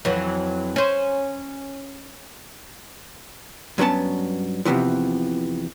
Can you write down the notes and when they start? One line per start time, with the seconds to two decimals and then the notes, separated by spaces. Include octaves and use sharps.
0.05 F2 E3 F#3
0.76 C#4 C5
3.78 G2 F#3 B3 C#4 A5
4.65 E2 G2 C3 E3 F3